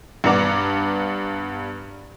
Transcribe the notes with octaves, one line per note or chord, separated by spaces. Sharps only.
G2 B3 D4 F#5 A#5 D6